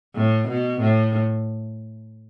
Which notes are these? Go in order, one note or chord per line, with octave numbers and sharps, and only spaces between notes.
A2
B2
A2